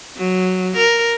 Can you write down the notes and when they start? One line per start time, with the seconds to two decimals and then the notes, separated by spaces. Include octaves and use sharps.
0.16 F#3
0.77 A#4